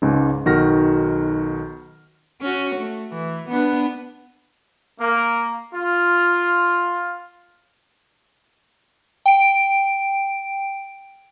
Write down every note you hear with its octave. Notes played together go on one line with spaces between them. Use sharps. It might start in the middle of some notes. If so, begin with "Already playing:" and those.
C#2 G#2 C#3 G#3
B1 D#3 F#4 F6 A#6
C#4 F#4
A3
E3
B3 D4 B4
A#3
F4
G5 D7